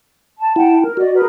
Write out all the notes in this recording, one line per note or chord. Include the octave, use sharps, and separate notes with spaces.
A5
E4 F#5 G5 A5
A#4
F#4 D5 D#5
G#4 A#4 B4